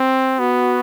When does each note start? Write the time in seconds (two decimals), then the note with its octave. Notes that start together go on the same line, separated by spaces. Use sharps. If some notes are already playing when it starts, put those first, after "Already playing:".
Already playing: C4
0.39 B3 F#4